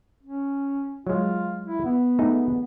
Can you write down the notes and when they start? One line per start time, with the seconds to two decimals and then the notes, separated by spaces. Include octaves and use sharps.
0.23 C#4
1.07 F#3 G#3 F4
1.66 E4
1.84 B3
2.19 A3 D#4 G#4